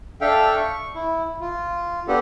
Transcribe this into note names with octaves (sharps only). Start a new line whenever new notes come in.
D4 A4 E5 F5 G5
C#6
E4
F4
B3 D4 G4 A4